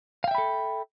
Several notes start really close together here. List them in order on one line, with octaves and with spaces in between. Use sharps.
F5 G5 E5 B5 A4